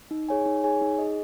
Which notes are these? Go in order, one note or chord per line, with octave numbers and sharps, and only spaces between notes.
D#4
G#4 C#5 G#5
D#4
G#4 C#5 G#5
D#4
G#4 D#5